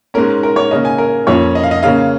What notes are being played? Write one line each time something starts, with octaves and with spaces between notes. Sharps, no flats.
G#2 G#3 C#4 A#4
A#4
C#5
C#3 A#3 C#4 D#5
G#5
A#4
F2 F3 A#3 C#4 C#5
D#5
F5
D#5
C#3 A#3 C#4 F5